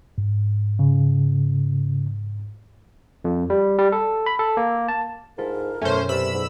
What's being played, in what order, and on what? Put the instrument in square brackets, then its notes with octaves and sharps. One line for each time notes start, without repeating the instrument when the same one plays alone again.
[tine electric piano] G#2
[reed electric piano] C#3
[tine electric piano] F2
G3
G3
A4
B5
A4
A#3
A5
[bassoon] G#2 [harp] E4 F4 A4 [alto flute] A#4
[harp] F#2 B2 [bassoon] A3 [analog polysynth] C#4 C5
[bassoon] C3 [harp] D5 D6 [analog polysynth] B5 E6
[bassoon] G#2